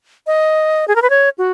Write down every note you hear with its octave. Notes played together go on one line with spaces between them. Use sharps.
D#5
G#4
A#4
B4
C#5
F#4